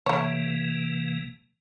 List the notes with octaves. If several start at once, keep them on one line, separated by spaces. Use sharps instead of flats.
C3 E3 A3 A#3 C#5